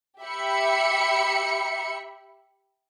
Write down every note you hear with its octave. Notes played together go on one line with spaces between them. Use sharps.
G4 E5 B5 C#7